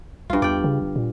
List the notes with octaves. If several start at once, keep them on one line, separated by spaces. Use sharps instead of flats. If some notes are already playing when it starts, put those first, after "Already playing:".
B1 G2 F4
E2 D5 G5
C#3
G1
A#2